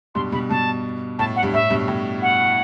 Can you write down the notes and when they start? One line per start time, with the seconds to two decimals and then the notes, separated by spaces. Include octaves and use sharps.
0.15 G2 B2 C6
0.32 G2 B2 B5
0.50 G2 B2 A5
1.19 A2 A5
1.36 F#5
1.43 G2
1.54 A2 E5
1.70 G2 B2
1.88 A2
2.22 F#5